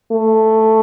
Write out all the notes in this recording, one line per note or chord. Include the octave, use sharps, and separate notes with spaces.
A3